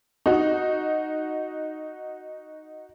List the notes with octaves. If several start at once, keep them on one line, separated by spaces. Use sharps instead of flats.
D#4 F#4